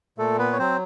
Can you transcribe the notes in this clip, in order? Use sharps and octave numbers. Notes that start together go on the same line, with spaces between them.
A#2 A3 A4
B3 B4
C#5
F#3 C4 C5